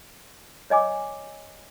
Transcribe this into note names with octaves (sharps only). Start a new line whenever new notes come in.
C#5 D#5 G#5 D6